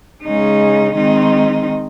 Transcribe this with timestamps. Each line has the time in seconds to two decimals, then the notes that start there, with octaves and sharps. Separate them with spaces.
0.23 C#3 G#3 D#4
0.95 D#3 G#3 C4 D#4